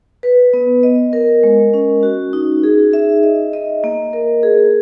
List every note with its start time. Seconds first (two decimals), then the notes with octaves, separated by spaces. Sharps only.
0.23 B4
0.53 B3
0.83 D#5
1.13 A#4
1.43 G#3
1.74 C#4
2.03 F#4
2.33 D#4
2.63 G#4
2.93 E5
3.23 D#5
3.53 D#5
3.84 A#3
4.13 A#4
4.43 G#4